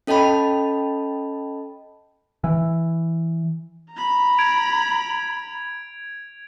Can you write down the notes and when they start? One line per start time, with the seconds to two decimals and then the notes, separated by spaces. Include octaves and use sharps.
0.07 C#4 A4 D#5 G5 A5 B5
2.44 E3
3.93 A#5 B5
4.38 G#6 D7 F7